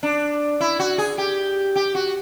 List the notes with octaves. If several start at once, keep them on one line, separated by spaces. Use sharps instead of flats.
D4
E4
F#4
G#4
G4
G4
F#4